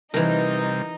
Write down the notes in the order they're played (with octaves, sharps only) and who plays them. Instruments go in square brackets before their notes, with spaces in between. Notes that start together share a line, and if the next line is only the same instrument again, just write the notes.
[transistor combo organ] C3 G3 [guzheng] E3 A#4 [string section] D#4